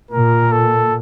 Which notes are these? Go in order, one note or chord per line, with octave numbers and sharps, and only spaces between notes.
A#2 A#4
A4